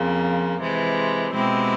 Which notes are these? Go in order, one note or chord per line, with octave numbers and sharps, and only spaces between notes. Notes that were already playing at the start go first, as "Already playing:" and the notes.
Already playing: F2 C#3 F3 A#3
C3 E3 G#3
B2 G#3 C4 E4 G4